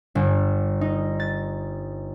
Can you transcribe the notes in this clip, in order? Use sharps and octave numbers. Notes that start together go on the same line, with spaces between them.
G1
D#4
A6